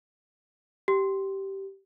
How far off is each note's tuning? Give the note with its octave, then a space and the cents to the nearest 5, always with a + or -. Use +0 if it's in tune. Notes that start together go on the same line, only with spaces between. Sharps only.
G4 -15